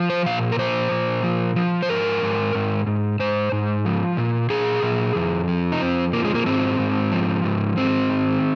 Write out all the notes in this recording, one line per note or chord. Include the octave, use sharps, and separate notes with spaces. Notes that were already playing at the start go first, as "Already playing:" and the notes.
Already playing: F3
C5
A#2 F5
A#4
F3 C5
A#2
F3
F3
C5
G#2 A#4
G#2
G#2
G#2
G#2 C5
G#2
F3
A#2
A#2 G#4
A#2
F2
F3
D#4
F2 C4
F3 A#3
G#3
A#3
G#2 C4
G#2
F3
G#2
G#2 C4
D#3